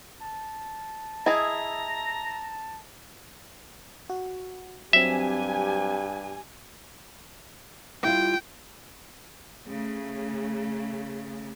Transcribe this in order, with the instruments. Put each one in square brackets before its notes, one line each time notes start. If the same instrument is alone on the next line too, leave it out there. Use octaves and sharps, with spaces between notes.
[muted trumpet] A5
[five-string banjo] E4 G#4 [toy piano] D#5 [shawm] A#5
[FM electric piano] F#4
[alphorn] G2 [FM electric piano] F#3 C4 [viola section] G4 G#5 [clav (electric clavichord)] E5
[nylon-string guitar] G3 E4 F4 [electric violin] G5
[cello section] C#3 A3